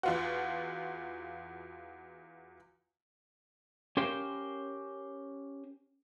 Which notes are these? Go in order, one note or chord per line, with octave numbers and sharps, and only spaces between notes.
E2 F4 F#4
C#4 G4 A#4 C5 F5 G5